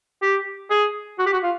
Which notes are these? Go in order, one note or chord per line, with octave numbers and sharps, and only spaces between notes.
G4
G#4
F#4
G4
F#4
F4